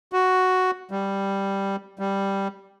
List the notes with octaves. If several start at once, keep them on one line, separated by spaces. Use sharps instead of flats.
F#4
G3
G3